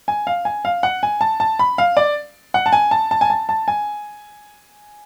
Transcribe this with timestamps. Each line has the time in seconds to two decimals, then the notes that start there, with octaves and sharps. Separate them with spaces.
0.08 G#5
0.27 F5
0.45 G#5
0.65 F5
0.83 F#5
1.03 G#5
1.21 A5
1.40 A5
1.59 B5
1.78 F5
1.97 D5
2.54 F#5
2.66 A5
2.73 G#5
2.91 A5
3.11 A5
3.21 G#5
3.30 A5
3.49 A5
3.68 G#5